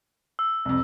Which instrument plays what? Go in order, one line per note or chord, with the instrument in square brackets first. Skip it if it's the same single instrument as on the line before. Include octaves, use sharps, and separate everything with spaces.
[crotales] E6
[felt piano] C2 F2